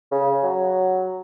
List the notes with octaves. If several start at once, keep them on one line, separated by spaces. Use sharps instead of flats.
C#3
F#3